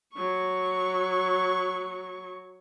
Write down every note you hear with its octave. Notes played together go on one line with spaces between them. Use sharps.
F#3 C#6